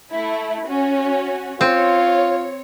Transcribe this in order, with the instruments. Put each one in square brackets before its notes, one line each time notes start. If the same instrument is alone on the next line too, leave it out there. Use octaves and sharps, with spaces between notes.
[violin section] A3 E4
C#4 F#4
[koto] C4 [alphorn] F4 [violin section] C#5